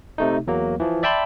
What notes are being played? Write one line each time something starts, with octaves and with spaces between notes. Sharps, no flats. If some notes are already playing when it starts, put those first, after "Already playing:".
C3 A3 D#4
E2 F#3 A#3
E3 F3
D5 E5 G5 A5 B5 C6